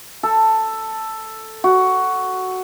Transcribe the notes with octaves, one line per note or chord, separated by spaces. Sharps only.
A4
F#4